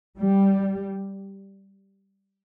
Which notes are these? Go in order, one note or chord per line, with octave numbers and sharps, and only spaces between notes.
G3